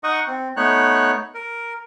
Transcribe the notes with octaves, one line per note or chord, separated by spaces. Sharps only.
D#4 D#5 F#5 C#6 D#6
C4
A3 B3 D#4 C#5 F#6
A#4